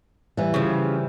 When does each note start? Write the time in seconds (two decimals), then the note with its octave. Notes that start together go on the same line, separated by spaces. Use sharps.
0.37 E3 G3
0.54 C#3 F3